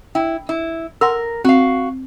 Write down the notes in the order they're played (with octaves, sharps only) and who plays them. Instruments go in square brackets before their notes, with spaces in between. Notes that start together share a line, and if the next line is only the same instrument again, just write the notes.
[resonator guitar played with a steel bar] E4 [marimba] G5
[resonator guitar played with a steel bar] E4
[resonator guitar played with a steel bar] A#4 [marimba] F#5 C6 E6
[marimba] C4 [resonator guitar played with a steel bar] F#4 F5